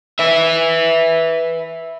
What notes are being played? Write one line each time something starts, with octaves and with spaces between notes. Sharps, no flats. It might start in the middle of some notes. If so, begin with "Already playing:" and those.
B4 E5